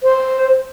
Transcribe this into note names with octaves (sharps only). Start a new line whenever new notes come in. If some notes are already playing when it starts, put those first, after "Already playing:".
C5